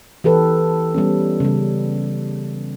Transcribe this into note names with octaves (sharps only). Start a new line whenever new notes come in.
E3 G4 A4 B4
G3 B3 C#4
C#3 G3